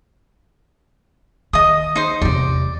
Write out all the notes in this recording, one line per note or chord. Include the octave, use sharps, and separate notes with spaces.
D#3 D#5 D#6
D#4 C5
E2 C3 D5